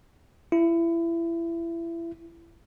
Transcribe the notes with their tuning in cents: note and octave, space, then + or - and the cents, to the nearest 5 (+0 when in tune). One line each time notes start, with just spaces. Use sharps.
E4 +25